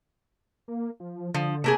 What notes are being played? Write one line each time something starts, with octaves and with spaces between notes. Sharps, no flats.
A#3
F3
D3 F3
C3 A3 A#3 G#4